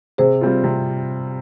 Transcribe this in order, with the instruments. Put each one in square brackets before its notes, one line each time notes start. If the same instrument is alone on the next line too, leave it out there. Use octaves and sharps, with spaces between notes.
[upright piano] C3 [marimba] G#4 C5
[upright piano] G3 C4 F4
C3